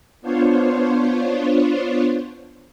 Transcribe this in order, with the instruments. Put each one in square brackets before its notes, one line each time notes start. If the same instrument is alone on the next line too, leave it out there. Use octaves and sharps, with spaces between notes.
[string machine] B3 D4 F4 C5 C#5